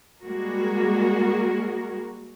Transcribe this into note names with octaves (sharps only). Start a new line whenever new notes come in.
G3 G#3 A#3 F#4 G#4 A#4